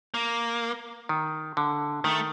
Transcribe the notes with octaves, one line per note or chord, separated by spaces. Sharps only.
A#3
D#3
D3
D#3 A3